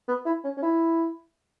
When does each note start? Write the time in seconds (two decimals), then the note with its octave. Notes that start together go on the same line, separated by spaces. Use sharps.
0.08 B3
0.26 E4
0.44 C#4
0.57 C#4
0.62 E4